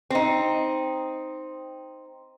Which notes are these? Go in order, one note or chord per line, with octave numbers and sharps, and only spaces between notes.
C4 D#4